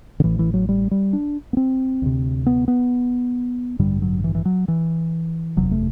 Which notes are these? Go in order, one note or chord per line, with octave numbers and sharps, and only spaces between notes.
D3
A1 A2 E3
E3
F#3
G3
G3
D4
B3
C4
D2 C3
B3
B3
A1 G2 D3 G3
F#3
E3
E3
F#3
E3
F#1 E2 C3 F#3
A3